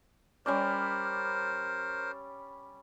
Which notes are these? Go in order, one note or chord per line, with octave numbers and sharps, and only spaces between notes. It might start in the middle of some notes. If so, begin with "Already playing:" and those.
G3 C#4 A#4 C5 D5